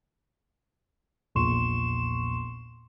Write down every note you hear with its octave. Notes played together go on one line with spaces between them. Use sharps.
A#1 E2 A#2 C6 C#6 E7